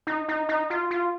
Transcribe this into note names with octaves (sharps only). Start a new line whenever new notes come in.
D#4
D#4
D#4
F4
F4